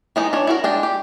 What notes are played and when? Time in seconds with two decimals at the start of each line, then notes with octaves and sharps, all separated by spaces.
0.16 E3 G#3 D#4
0.33 D4 C#5
0.47 E4 F#4 A#4
0.64 G#3 D4 G5
0.83 G4